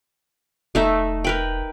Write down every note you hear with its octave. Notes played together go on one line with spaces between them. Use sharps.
E1 A3 D#4 E5
A#4 B4 G5